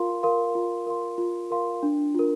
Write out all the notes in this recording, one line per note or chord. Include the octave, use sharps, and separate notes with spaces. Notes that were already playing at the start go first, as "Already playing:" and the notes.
Already playing: F4 A#4 F5 C6
A#4 F5 C6
F4
A#4 F5 C6
F4
A#4 F5 C6
D4
F4 A#4